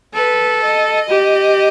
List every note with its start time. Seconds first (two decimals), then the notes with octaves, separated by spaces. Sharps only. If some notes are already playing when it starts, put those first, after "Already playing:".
0.14 A4 B4
0.62 D#5
1.09 G4